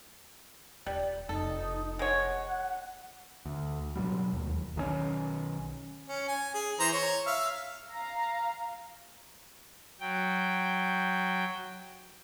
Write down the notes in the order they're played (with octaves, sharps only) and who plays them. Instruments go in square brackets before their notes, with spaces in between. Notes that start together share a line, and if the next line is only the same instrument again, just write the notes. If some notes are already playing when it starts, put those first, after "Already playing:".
[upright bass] D#1 [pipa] G3 [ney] D5
[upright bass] F1 [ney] D#4 [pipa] A4
[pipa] G#3 C#5 [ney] F#5
[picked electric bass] D2
G2 B2 F#3 G3
E1 D#2
B1 D#3 F3 C#4
[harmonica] C#4
G#5
G#4
E3 C5 A#5
C#5
E5 F5
[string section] F5 A#5
[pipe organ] F#3 G5